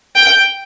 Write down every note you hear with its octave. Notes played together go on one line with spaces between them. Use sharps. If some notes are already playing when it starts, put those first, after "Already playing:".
G5